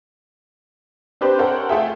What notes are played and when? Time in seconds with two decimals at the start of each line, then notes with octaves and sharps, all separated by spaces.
1.21 C4 D4 G4 B4 C5 D5
1.39 A4 A#4 C5 C#5 F#5 G5
1.69 A3 F4 G#4 E5 G5